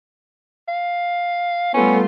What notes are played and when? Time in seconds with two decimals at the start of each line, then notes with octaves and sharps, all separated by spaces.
0.68 F5
1.74 G3 A3 B3 C#4 F4